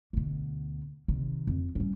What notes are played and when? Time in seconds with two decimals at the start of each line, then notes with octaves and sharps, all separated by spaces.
0.13 D2 B2
1.08 C3 D#3
1.47 F2
1.75 G3 C#4